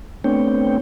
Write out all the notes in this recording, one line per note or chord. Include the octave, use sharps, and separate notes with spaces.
A3 B3 C4 D4 C#5 G5